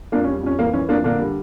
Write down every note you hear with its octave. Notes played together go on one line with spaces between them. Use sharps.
F2 A#3 D4
C#4
G3
F2 C#4
E3 A#3
E3 C#4
F2 A#3 D4
D3 A#3 D4
G3